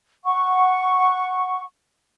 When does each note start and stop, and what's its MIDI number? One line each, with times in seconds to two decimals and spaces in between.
0.24 1.62 78
0.24 1.62 85